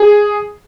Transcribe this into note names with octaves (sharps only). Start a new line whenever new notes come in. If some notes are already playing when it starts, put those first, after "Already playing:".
Already playing: G#4